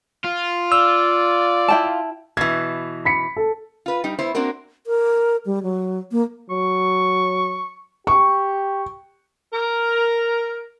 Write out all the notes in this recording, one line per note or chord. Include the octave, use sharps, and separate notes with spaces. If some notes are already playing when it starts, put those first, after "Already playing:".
F4
D5 E6
E4 G5 A5
B2 E3 G#6
B5 B6 C#7
A4
F4 B4
G3 D#4
B3 E4 C5
A#3 C4 D4 F#4 A#4
A#4
G3
F#3
A#3
F#3 C#6
G4 C#6
A#4